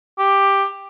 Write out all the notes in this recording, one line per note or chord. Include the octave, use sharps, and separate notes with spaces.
G4